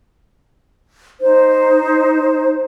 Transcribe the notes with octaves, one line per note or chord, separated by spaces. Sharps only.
D#4 C5